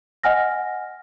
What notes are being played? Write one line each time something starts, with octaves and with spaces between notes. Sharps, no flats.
D#5 F#5 G#5 F6 A#6